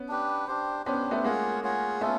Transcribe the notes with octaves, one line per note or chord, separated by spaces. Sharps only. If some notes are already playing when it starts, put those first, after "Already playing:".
Already playing: B3 C#4
D4 G4 B4
D4 G4 C5
B3 C#4 D4 G4 C5
A3 B3
G#3 A#3 F4 G#4 C#5 F#5
F4 G#4 C#5 F#5
A3 B3 C#4 F4 A4